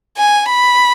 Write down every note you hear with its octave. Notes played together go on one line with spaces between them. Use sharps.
G#5
B5